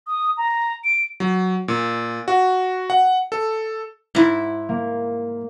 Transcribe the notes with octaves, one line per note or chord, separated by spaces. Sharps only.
D#6
A#5
D7
F#3
A#2
F#4
F#5
A4
G#2 E4
A#3